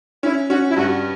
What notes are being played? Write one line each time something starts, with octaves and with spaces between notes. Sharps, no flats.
C#4 E4
C#4 F#4
E4
G2 F#4